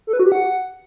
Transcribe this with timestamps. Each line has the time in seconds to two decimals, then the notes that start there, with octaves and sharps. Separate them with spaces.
0.07 A4
0.13 B4
0.19 F#4
0.26 G4
0.32 F#5